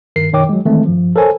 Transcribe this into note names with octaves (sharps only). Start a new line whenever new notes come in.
G2 D#3 A#4 C7
F#2 B2 D#3 C#5 G5 D6
F#3 G#3
D#3 E3 G#3 A3 C4
G2 F3
A4 A#4 C5 C#5 G#5